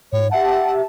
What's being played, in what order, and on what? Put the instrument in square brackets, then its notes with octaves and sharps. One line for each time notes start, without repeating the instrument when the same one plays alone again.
[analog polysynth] G#2 [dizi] C#5
[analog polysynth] G4 E5 A5 [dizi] F#5